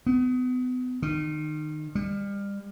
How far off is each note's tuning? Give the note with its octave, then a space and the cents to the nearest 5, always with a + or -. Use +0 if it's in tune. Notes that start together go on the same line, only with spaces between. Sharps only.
B3 +35
D#3 -25
G3 +35